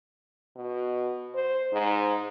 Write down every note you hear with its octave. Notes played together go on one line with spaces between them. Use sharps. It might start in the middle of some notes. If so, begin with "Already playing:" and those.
B2
C5
G#2